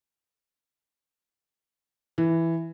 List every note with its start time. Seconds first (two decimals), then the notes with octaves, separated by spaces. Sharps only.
2.18 E3